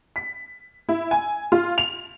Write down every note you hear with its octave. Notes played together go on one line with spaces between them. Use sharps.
B6
E4
G#5
F4
F7